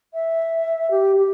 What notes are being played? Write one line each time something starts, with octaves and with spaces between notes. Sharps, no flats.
E5
G4
G4